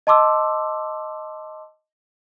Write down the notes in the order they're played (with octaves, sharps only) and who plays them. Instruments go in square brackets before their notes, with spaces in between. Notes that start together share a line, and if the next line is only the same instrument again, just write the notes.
[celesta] D#5 A5 C6 D6 E6